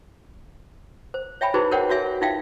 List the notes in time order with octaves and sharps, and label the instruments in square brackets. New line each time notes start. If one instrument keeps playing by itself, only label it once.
[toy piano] C5
C#5 E5 G5 G#5 B5
D#4 E4 F#4 G#4 B4 C5
A#4 C5 C#5 F#5 G5
F#4 C#5 E5 G#5
D#4 F4 E5 F5 G5